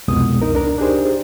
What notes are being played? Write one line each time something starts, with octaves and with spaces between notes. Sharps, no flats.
C2 F2 B2 G#3 B3 D#6
D#4 A#4
C#2 D4 A#4
D4 D#4 G4 G#4 C5